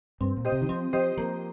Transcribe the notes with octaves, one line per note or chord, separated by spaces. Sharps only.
G2 C4
A#2
G4 C5 D#5
C3
D#3
F3 C4
F3 G4 C5 D#5
F3 A#3